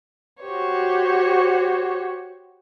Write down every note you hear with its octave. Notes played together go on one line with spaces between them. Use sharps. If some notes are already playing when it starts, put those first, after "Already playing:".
F#4 G4 C5 C#5